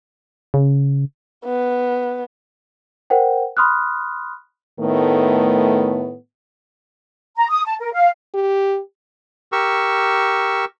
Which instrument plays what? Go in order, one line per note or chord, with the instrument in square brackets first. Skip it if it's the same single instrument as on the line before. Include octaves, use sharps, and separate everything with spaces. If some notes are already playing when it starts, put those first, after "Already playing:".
[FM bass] C#3
[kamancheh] B3
[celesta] A#4 C5 F#5 G5
B5 C6 D#6 F6 F#6
[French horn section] A2 D#3 A3 B3
[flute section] A#5
D#6
A5
A#4
F5
[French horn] G4
[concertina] G4 A#4 C#6 E6